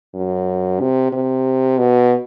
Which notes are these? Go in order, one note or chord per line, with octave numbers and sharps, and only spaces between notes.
F#2
C3
C3
B2